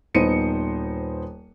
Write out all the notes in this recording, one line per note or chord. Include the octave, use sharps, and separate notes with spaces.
D#1 B3 D#4 C5 C#7 D#7